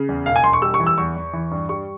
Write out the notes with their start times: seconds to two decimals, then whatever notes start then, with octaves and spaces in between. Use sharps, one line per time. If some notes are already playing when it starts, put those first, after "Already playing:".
Already playing: C#3
0.09 E2
0.26 E1 F5
0.36 G#5
0.44 E1 C6
0.53 C#6
0.62 G3 E6
0.74 C#6
0.80 E3
0.87 E6
0.98 E2 C#6
1.16 E2
1.33 E3
1.51 G2
1.69 G3 C#6